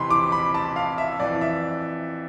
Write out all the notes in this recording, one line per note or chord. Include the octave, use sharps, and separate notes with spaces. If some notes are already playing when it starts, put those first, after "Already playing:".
Already playing: F2 C3 E3 B5 C6
D6
B5
A5
F5
E5
F2 E3 D5
E5